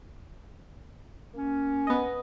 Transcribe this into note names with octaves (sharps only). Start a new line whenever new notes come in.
A#3 C#4
B3 D#5